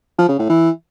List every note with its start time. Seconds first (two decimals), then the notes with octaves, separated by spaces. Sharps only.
0.18 F3
0.28 C#3
0.39 A2
0.49 E3